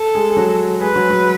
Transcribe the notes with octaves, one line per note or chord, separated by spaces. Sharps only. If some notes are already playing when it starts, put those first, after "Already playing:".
Already playing: A4
G#3 G#4
G#4
F#3 F#4
G#3 G#4 B4
F#3 F#4
F#3 F#4